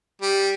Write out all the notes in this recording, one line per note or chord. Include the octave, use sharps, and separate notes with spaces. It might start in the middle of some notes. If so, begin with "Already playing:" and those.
G3